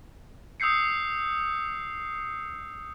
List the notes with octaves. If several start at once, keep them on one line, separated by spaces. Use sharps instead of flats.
D#6 E6 G6 C7 C#7